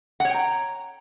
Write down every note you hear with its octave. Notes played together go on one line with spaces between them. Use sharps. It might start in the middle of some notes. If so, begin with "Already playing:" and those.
C#5 F#5 G5 A#5